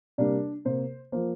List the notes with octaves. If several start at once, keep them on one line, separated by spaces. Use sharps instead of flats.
C3 G3 A#3 D4 D5
C3 A#3 C5
F3 A#3 C5